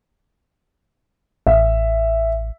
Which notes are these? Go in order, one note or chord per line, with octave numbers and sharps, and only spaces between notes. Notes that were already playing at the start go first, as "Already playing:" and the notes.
A1 E5